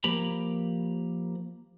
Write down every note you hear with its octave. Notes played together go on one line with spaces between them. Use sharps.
F3 A#3 G4 A#5 B5